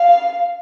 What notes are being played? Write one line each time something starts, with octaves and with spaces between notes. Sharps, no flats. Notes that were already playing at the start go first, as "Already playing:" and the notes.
Already playing: F5